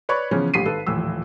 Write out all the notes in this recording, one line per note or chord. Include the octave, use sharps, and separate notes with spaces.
B4 C#5 D5 B5 C#6
C#3 E3 F3 B3 C#4
A#1 A2 G3 B6 C7 D#7
G#1 A4 B4
D#1 A2 E3 F3 E6